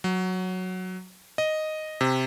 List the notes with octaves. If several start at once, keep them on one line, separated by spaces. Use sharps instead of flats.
F#3
D#5
C3